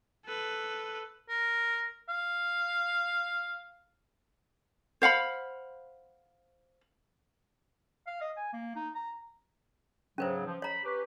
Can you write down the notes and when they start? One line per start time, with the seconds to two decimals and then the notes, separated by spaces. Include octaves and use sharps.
0.25 A4 B4
1.29 A#4
2.09 F5
5.02 C5 F5 F#5 B5
8.07 F5
8.21 D#5
8.37 G#5
8.53 A#3
8.76 D#4
8.95 A#5
10.18 G#2 C#3 F#3 C#4 B4 C5
10.46 F3
10.62 C#5 A#5 B5
10.84 C#4 G4 B4